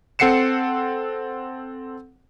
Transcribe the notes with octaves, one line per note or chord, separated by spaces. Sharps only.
C4 A4 F#5 C7 C#7 E7